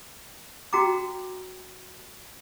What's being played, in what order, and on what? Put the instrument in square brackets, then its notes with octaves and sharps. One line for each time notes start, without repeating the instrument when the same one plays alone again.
[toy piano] F#4 G5 A#5 D6